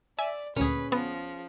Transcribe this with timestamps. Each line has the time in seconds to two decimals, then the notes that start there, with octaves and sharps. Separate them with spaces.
0.19 D5 E5 G#5
0.56 D2 A#2 C#4 G#4 B4
0.92 F3 B3